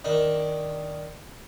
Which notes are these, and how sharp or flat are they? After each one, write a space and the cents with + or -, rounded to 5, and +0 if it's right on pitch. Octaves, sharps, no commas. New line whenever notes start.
D#3 +0 D4 +0